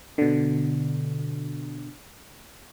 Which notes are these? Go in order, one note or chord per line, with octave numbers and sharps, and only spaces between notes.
B2 D3